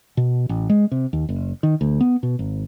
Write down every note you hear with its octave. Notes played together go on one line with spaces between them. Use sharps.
B2
A1
G#3
C3
D#2
F#1
D#3
D2
B3
B2
G#1